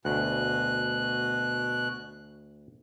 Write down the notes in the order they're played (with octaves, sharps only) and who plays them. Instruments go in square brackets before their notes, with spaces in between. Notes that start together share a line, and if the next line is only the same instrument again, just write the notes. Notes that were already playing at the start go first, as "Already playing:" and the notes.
[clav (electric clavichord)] D2 [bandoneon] B2 F#6